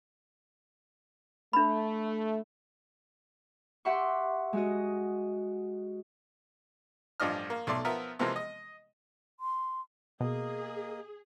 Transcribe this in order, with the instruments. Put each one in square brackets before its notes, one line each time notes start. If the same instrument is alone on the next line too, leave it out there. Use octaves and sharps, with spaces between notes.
[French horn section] A3 [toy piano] D4 B5
[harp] G4 E5 F#5 C6 C#6
G#3 F#4 D#5
[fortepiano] A1 G2 F3 D4 D#5 F6
A#3
B1 A3 D5 C6
F3 B3 A#4 E5
C3 E3 F3 G#3 A#3 C4
D#5
[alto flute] C6
[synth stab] B2 [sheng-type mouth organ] A#3 D#5 [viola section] G#4